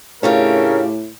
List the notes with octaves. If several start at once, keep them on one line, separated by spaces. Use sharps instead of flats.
A2 C#3 A3 D4 F4 G4 A#4 C#5